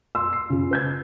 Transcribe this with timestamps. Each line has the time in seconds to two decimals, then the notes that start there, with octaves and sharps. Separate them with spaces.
0.15 C6 E6
0.33 C7
0.50 C#3 F4
0.71 B4 G6 G#6